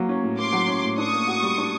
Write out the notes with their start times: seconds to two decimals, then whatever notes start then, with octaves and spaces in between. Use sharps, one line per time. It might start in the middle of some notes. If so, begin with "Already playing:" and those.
Already playing: F#3 A#3
0.09 C#4
0.23 A2
0.38 A#3 C6 D6
0.53 F#3
0.68 C#4
0.83 A2
0.98 D4 C#6 D#6
1.13 A#3
1.27 F#4
1.42 G3
1.58 D4